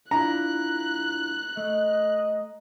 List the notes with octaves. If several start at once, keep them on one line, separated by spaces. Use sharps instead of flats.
D4 E4 F4 A#5 F#6
A3 D#5